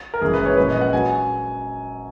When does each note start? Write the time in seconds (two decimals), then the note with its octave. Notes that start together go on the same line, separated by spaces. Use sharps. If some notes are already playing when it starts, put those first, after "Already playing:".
0.14 A#4
0.22 F#1 F#2 C#3 E3 G#3 G#4
0.34 B4
0.46 C#5
0.57 A#1 A#2 G#3 C#4 B4
0.69 D#5
0.81 F#5
0.93 F#3 G#5